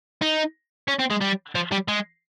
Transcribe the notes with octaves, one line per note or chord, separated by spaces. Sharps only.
D#4
C#4
C4
G#3
G3
F3
G3
G#3